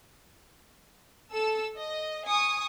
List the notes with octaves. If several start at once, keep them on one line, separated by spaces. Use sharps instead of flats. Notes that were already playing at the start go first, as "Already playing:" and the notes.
A4 E6
D#5
G#5 C#6 D#6